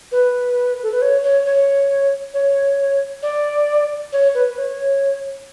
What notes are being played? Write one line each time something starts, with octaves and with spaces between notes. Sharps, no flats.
B4
A4
B4
C#5
C#5
C#5
C#5
D5
C#5
B4
C#5